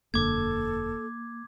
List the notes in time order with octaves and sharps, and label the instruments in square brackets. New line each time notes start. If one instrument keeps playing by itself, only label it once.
[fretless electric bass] E1 F#2 D3 [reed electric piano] A#3 [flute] A4 [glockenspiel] D6 G#6